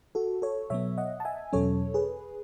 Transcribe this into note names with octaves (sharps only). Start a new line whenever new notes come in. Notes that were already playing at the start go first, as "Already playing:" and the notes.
F#4 A4
A4 C#5
B2 F#3 B3 C#5 E5
D#5 F#5
A5
E5 G#5
E2 B2 F#3 C#4 A4 C#5
G#4 B4